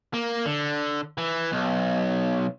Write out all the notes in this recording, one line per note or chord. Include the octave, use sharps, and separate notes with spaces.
A#3
D3
E3
B1